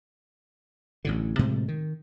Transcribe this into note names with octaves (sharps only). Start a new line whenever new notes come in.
A1 A2 D3
A2 C3 F3 G#3
D#3